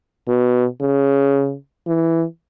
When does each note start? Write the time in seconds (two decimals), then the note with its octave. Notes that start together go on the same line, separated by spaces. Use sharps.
0.28 B2
0.81 C#3
1.87 E3